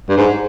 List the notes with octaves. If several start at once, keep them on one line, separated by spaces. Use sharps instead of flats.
G2
G#2